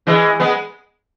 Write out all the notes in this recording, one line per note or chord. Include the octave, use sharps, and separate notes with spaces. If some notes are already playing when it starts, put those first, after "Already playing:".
E3 G#3
G#3 B3